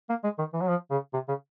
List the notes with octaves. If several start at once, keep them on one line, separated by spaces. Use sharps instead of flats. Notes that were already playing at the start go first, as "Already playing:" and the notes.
A#3
G#3
D#3
E3
F#3
F3
C#3
C3
C#3